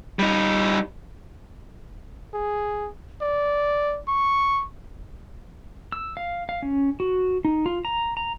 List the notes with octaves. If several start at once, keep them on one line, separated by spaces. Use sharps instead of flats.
G3 D#4
G#4
D5
C#6
E6
F5
F5
C#4
F#4
D#4
F4
A#5
A#5